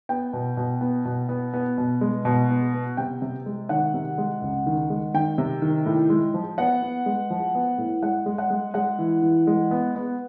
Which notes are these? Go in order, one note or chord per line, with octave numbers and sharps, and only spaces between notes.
B3 G5
B2
B2
B3
B2
B3
B3
B2
G#3
B2
B3
B3
C3 G5
C3
G#3
D#3 F#5
C3
G#3
C#2
D#3
G#3
D#3 G5
C3
D#3
A2
G#3
F3
B3 F#5
B3
G#3
F3
B3
A2
G#3 F#5
G#3
F#5
G#3
G#3 F#5
E3
E3
G#3
B3
B3